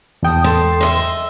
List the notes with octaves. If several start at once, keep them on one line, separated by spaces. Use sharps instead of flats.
E2 G5 A5 D#6
A4 C6
D#5 E5